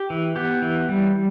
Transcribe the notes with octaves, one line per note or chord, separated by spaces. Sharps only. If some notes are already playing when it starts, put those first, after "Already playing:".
Already playing: G4
E3
B3 G4
E3
G3